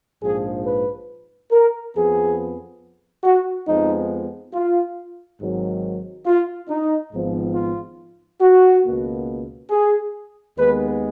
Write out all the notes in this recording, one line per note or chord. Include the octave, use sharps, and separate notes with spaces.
A#1 G#2 F3 G#4
B4
A#4
F2 F3 B3 G#4
F#4
F2 F3 G#3 B3 D#4
F4
G#1 G#2 D#3 F#3
F4
D#4
G#1 G#2 F3 B3
F4
F#4
C#2 B2 A#3
G#4
D#2 D#3 G#3 B3 B4